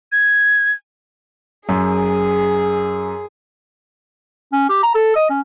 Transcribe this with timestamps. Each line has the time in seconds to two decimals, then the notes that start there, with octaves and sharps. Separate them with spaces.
0.12 G#6
1.69 F#2 G#4
4.52 C#4
4.69 G4
4.83 A#5
4.95 A4
5.15 D#5
5.30 C#4